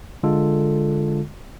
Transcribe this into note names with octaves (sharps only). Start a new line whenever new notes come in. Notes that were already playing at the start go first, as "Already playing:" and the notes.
D3 G#3 F4 A4